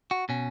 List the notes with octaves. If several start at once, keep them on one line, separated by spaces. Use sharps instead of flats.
F#4
B2 C#4